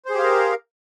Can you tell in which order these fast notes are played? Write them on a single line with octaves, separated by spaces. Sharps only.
C5 G#4 G4 F5 A#4